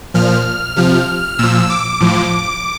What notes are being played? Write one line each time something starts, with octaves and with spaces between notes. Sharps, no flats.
A#2 F3 F6
C3 F3
A#2 F3 E6
D6
A2 F3